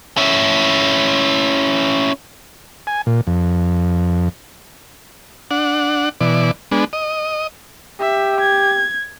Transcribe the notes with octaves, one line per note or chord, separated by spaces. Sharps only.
C#4 E4
G#5
A#2
F2
D4 F#5
B2 E3 D5
G#3 B3 D4
D#5
G4 E5
G#6